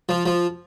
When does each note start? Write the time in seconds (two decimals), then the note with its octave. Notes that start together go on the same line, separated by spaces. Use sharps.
0.09 F3
0.26 F3